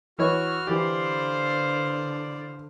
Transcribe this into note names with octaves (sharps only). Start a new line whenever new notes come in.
E3 F#4 B4 C#5 F6
D3 E3 G4 C5 D5 F5